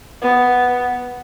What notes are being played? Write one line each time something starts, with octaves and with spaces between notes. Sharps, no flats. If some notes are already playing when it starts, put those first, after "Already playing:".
B3